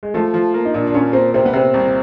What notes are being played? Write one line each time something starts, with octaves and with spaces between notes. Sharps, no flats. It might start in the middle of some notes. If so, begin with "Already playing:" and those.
G#3
F3 A3
F3
A#3
D#4
A#2 D4
D4
A#2 C#4
A#3 C4
C3 C4
B3
C3 C4
C2